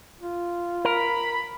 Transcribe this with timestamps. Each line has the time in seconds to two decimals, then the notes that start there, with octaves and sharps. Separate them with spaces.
0.21 F4
0.85 A#4 B5